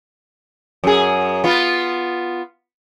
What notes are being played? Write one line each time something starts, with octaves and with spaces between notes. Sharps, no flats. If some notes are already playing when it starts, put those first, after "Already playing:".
F#2 G#4
B3 F4